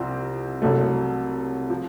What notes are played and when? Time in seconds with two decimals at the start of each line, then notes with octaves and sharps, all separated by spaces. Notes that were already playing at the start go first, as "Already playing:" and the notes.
Already playing: C2 C3 F3 C4
0.62 C2 C3 F#3 A3
1.70 F3